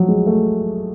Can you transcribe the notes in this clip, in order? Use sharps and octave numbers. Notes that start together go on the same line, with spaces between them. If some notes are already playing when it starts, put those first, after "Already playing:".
Already playing: F3 F#3
G#3
A3